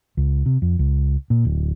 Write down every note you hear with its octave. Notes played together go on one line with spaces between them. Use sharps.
C#2
C3
F2
C#2
A#2
D1